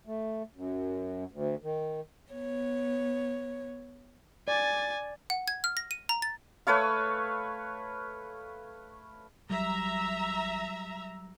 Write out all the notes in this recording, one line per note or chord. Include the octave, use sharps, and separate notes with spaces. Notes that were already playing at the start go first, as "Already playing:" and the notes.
A3
F#2
D2
D#3
B3 C#5
D5 G#5 A6
F#5
G#6
F6
A#6
D#7
A#5
A6
A3 B4 C#5 F5
A1 F#3 G3 E5 A#5